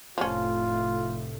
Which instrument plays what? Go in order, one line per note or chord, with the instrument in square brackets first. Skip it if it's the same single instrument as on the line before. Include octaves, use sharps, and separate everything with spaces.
[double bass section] F1 A2 A3 [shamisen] F3 C#4 [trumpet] F4